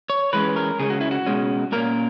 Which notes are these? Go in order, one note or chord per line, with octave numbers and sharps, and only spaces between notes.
C#5
E3 G#3 C#4 B4
A#4
C#3 G#3 C#4 G#4
F#4
E4
F#4
B2 G#3 C#4
A#2 A#3 C#4 A#4